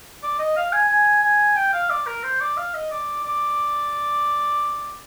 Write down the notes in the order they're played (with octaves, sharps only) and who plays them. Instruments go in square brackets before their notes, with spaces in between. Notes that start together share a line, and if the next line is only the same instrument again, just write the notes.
[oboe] D5
D#5
F5
G#5
G#5
G#5
G5
F5
D5
A#4
C5
D5
F5
D#5
D5
D5